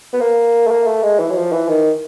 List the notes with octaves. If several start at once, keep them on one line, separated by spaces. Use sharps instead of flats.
B3
A#3
A3
A#3
A3
G#3
E3
F#3
F3
E3
D#3